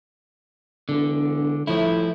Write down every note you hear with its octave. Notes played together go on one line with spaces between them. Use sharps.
E1 D3
A2 F3 E4